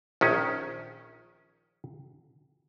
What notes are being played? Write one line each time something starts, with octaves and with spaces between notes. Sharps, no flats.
A#1 D#3 C#4